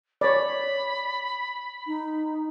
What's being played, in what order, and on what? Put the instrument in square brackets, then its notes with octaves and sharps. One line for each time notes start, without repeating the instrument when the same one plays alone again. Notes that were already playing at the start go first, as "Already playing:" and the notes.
[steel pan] C#5 D5 [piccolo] B5
[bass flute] D#4